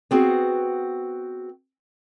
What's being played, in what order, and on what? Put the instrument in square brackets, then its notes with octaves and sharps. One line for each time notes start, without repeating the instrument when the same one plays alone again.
[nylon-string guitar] B3 C4 F#4 G#4